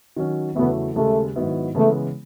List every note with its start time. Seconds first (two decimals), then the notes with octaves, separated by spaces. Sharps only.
0.16 D#3 F#3 C#4
0.55 E2 C#3 F#3 A3 B3 E4
0.96 D#2 C#3 G#3 A3
1.36 G#2 D#3 F#3 B3 E4
1.75 C#3 E3 G#3 A3 B3